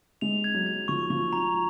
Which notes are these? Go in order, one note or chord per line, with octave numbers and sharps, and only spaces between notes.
G#3 F7
G#6
F#3
G#6
F3 C#6
F3 C#6
A#5